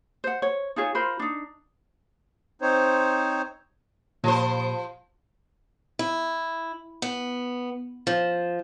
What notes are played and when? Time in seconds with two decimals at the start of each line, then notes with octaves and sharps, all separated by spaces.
0.24 C5 F#5
0.42 C#5
0.76 D#4 F4 G#4 C#5
0.95 F4 A#4 C5 B5
1.19 D4 D#4
2.62 C4 D#4 C5 C#5
4.24 A#2 F3 G4 C5 B5
5.99 E4
7.02 B3
8.07 F3